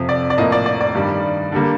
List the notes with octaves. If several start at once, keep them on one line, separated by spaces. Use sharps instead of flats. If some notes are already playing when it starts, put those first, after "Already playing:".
Already playing: F2 C3 F3
D5
D5
A2 F3 A#3 D#5
D5
D5
D5
G2 D#3 G3
D3 G3 A#3